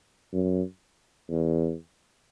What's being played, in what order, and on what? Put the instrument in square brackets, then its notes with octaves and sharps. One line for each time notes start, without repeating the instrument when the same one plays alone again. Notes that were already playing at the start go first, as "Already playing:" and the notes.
[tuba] F#2
E2